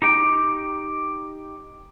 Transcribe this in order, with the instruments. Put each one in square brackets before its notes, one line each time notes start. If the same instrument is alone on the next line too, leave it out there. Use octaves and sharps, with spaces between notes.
[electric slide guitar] D#4 G4 G5